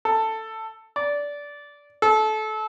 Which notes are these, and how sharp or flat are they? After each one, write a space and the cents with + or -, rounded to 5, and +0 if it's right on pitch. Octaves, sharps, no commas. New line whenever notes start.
A4 +10
D5 -15
A4 -25